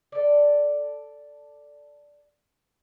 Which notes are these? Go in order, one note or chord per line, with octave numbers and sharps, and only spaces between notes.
A4 D5